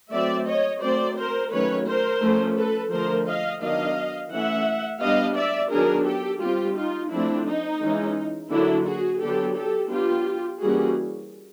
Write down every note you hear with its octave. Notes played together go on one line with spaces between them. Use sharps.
F#3 A3 C4 D5 E5
C#5 D#5
F#3 A3 C4 C5 D5
A#4 C5
D#3 F#3 A3 C#4 B4 C#5
A#4 C5
F3 A3 C#4
A4 B4
D3 F3 A3 A#4 C5
D#5 F5
D#3 F#3 B3 D4 D#5 F5
E3 A3 C#4 E5 F#5
G3 B3 D4 D#5 F5
D5 E5
D#3 F#3 B3 D4 G#4 A#4
G4 A4
G3 C4 F4 G4
D#4 F4
F3 A3 C4 D4 E4
D#4
E3 G#3 C#4
D3 F#3 A#3 D4 E4
F#4 G#4
D3 F#3 B3 D4 G4 A4
G4 A4
F#3 B3 D4 F4 G4
E3 G3 A#3 C#4 F#4 G#4